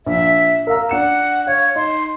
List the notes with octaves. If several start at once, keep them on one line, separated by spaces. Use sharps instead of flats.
A#1 E5
A#4 F5 A#5 E6
D4 F#5 C#7 E7
C#5 F5
D#4 C6